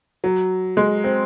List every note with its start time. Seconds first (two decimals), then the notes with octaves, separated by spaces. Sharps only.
0.24 F#3
0.77 G#3
1.04 C4